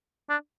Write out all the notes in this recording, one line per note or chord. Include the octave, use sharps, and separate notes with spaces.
D4